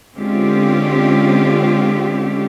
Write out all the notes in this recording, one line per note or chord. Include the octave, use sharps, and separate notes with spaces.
D3 G#3 C4 C#4 F4 G4